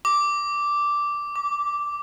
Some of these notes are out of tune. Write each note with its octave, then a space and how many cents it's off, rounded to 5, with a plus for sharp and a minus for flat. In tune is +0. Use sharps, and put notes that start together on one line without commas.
D6 -5
D6 -25